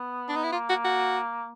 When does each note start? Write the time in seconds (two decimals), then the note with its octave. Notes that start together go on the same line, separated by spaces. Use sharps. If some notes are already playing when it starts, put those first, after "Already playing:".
Already playing: B3
0.29 D4
0.36 D#4
0.44 E4
0.52 A#3 F4
0.69 F#4
0.85 F#4